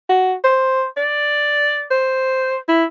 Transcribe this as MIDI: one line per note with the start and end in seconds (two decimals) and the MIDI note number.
0.09 0.34 66
0.44 0.86 72
0.97 1.85 74
1.91 2.57 72
2.68 2.85 64